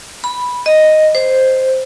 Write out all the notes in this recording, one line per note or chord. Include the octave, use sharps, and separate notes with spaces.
B5
D#5
C5